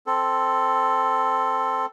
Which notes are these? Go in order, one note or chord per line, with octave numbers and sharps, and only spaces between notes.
C4 A4